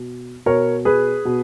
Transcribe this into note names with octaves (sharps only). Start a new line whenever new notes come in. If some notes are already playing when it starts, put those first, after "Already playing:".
Already playing: B2
B2 A#4 C#5
G#4 B4
B2